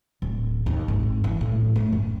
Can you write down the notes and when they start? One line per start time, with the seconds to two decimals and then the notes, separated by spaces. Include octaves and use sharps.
0.22 D1
0.66 D#2
0.88 G#1
1.24 E3
1.41 A2
1.76 A3
1.92 F#2